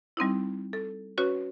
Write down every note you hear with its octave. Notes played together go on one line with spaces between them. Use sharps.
G3 C4 D#4 E4
A4
C#4 F#4 B4 C#5